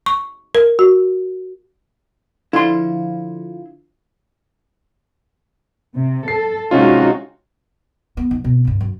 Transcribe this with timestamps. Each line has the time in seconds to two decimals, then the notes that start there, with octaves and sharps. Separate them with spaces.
0.06 C#6
0.55 A#4
0.79 F#4
2.53 D3 F3 E4 F4 C6
5.95 C3
6.28 A4 C7
6.71 C3 G#3 C#4 D#4 F4 F#4
8.17 B3
8.31 D#3
8.44 B2 C4
8.65 D2 G2
8.81 F#2